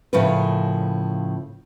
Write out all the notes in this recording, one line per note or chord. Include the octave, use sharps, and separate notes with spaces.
A2 C#3 F3 A3 A#4 B4